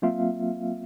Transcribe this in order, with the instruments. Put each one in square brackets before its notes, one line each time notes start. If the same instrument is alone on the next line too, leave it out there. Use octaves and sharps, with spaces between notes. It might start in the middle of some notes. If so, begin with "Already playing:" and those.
[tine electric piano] F#3 A#3 C4 F4 E5 F5